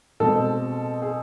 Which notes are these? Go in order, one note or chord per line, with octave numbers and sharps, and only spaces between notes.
B2 G#3 C4 A4
G#4